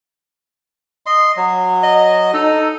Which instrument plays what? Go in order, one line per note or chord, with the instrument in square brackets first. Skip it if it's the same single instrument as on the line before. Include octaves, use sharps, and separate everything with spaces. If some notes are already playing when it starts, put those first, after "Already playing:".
[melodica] D#5 C6
F#3
[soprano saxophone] D#5
[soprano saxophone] D#4 [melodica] A4